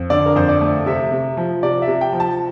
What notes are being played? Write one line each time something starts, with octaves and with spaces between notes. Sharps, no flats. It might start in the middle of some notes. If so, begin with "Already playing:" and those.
Already playing: F2
D3 D5
A#4
F2 C5
D5
A3
C3 E5
C3
F3
C3 D5
E5
C3
G5
F3
A5